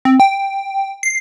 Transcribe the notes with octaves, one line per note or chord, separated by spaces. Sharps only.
C4
G5
C7